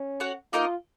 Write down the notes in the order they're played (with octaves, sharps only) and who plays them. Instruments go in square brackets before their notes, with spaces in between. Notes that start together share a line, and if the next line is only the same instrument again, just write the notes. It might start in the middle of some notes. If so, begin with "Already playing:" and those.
Already playing: [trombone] C#4
[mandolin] F#4 C#5 F#5
[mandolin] A#3 D#4 A#4 D#5 [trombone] F4